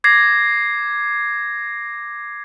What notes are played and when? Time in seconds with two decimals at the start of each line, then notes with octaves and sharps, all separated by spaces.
0.04 D6 G#6 A#6 C7